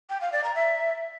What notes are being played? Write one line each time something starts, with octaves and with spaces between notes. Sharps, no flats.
G5
F5
D5
A#5
E5